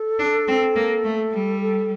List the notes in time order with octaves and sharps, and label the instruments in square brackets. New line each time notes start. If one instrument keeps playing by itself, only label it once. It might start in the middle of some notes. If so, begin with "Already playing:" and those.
Already playing: [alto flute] A4
[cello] D4
C4
A#3
A3
G3
[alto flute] A4